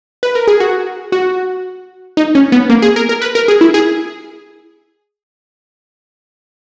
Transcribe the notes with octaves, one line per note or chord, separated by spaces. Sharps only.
B4
A#4
G#4
F#4
F#4
D#4
C#4
B3
A#3
G#4
A#4
A#4
B4
A#4
G#4
E4
G#4